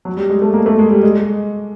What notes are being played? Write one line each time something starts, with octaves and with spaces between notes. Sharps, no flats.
F#3
G3
G#3
A3
A#3
A3
G#3
G3
G#3